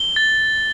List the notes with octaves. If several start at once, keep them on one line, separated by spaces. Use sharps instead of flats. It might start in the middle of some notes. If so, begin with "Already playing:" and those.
Already playing: G7
A6